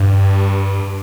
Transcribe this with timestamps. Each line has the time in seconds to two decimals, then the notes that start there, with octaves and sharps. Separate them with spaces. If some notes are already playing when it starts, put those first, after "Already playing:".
Already playing: G2